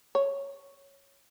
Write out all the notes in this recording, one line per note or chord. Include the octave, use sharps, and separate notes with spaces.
C#5